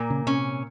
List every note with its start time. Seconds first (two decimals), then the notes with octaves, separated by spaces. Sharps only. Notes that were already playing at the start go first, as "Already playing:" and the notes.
Already playing: A#2 A#3
0.10 C#3
0.27 C3 C#4